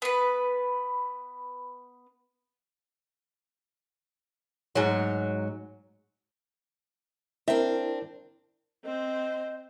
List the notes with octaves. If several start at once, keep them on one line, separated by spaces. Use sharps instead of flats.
B3 B4
G#2 F#3
C4 D4 E4 A#4 E5
C4 C5 D#5